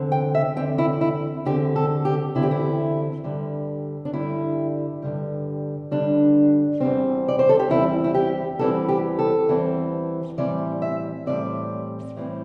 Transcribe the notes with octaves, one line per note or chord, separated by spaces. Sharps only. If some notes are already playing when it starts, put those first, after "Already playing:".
Already playing: E2 D3 C4
G5
E5
E2 D3 C4 G5
E4
E4
E2 D3 C4 G4
A4
G4
E2 D3 C4 E4
G4
E4
G2 D3 G3
D4
G2 D3 G3 E4
G2 D3 G3
G2 D3 G3 D4
E2 E3 G3 C4
D5
C5
A4
G4
E2 E3 G3 C4 E4
E4
G4
E2 E3 G3 C4 A4
G4
A4
E2 E3 G3 C4
A2 E3 G3 C4 D5
E5
A2 E3 G3 C4 D5
A2 E3 G3 C4